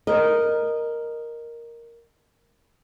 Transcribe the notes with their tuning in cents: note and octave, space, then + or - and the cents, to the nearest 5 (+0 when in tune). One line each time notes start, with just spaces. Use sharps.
A#4 +0 D#5 -15